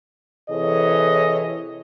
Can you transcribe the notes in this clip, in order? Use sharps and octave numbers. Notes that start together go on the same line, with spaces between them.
C3 E3 G#4 A4 C#5 D#5